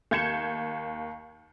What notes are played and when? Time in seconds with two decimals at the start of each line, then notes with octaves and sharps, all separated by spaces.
0.11 D#2 G6 G#6 C#7 E7